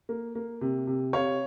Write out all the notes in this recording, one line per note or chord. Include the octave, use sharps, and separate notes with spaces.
A#3
A#3
C3
C3
C3 C#5 F5